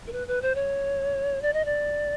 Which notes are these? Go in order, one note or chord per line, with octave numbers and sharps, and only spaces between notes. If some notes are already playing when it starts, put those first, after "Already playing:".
A#4
B4
B4
C5
C#5
D5
D#5
D5